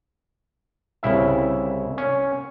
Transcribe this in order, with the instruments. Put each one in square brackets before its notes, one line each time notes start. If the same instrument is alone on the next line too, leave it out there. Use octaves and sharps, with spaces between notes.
[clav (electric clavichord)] C2 C#3 E4 E5
C#4